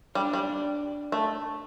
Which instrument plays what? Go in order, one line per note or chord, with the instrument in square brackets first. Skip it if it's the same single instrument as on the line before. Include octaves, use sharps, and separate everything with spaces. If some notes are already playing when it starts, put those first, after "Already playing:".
[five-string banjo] G3 [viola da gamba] D4
[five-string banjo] G3
A3